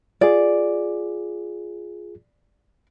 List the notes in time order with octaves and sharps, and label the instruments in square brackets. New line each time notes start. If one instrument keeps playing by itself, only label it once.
[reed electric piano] F4 G#4 [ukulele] D5